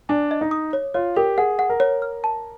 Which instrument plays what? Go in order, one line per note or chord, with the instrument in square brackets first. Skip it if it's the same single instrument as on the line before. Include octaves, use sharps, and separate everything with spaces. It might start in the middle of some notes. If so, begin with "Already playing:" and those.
[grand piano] D4 [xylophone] G#5
[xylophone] D#5
[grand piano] D#4
[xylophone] D#6
C#5
[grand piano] F4 [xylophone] C#5
[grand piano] G4 [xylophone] A#4
[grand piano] G#4 [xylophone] F#5
[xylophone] F#5
[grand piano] A#4
[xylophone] C#5
F6
A5